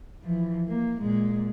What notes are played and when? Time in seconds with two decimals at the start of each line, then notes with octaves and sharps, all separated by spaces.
0.23 E3 F3
0.68 A#3
1.00 A#2 G#3